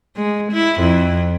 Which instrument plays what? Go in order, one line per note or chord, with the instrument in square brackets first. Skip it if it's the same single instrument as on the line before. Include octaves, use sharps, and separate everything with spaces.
[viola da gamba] G#3
E4
F2